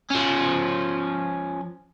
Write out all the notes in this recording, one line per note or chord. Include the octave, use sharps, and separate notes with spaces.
F3 C#4